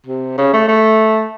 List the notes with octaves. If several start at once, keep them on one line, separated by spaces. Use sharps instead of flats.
C3
C#3
A3
A3